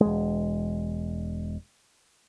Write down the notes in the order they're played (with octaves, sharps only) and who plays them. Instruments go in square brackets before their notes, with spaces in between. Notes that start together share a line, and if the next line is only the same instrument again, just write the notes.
[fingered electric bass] E1 G#3